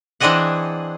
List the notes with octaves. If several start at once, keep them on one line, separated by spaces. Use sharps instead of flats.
E3 C4 D4 G#4 D#5 F#5